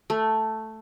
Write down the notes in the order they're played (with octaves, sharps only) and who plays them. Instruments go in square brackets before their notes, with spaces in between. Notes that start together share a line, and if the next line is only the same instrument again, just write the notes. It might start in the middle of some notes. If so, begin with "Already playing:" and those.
[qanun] A3